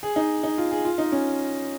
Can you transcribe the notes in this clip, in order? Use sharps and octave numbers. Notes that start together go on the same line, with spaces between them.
G#4
D#4
D#4
F4
G#4
F4
D#4
C#4